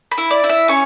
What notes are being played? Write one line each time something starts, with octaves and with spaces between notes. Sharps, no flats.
B5
E4
D5
E4
E5
C#4 C#6